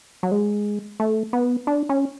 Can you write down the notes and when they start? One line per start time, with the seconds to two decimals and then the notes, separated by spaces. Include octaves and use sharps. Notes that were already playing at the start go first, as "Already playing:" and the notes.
0.23 F#3
0.32 G#3
1.00 A3
1.33 B3
1.67 D4
1.89 C#4